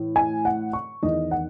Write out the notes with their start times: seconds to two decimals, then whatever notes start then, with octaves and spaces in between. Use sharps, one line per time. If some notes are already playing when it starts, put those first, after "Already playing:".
Already playing: A2 E3
0.16 G#5
0.45 F#5
0.73 C#6
1.03 E2 D#3 D#5
1.31 F#5